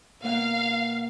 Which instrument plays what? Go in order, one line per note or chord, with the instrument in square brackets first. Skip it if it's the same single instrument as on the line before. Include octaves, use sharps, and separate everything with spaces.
[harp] B2 A#3 F#5 [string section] F5